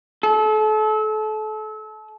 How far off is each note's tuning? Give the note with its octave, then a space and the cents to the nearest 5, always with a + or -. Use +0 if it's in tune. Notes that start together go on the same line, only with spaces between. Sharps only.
A4 -35